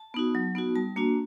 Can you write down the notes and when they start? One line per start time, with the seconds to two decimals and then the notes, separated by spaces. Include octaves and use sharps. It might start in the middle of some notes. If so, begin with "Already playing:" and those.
Already playing: A5
0.14 B3 D#4 F#4
0.35 F#3
0.55 B3 D#4 F#4
0.76 G3 A5
0.96 A#3 D4 F#4